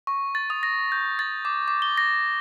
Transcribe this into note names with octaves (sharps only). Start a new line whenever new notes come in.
C#6
A6
D#6
A#6
G6
A6
D6
D6
G7
A#6